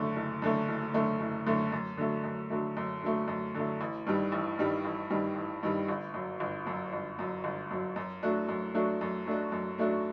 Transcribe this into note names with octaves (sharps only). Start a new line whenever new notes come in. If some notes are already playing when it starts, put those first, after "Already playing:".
Already playing: F#1 F#2 D3 A3
F#1
F#2 D3 A3
F#1
F#2 D3 A3
F#1
F#2 D3 A3
F#2
D3 F#3 A3
F#2
D3 F#3 A3
F#2
D3 F#3 A3
F#2
D3 F#3 A3
A1
G2 D#3 G3
A1
G2 D#3 G3
A1
G2 D#3 G3
A1
G2 D#3 G3
G1
F#2 F#3
G1
F#2 F#3
G1
F#2 F#3
G1
F#2 F#3
F#2
F#3 A3 D4 F#4
F#2
F#3 A3 D4 F#4
F#2
F#3 A3 D4 F#4
F#2
F#3 A3 D4 F#4